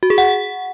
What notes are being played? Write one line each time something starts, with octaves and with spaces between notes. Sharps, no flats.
F#4
G#4
F#5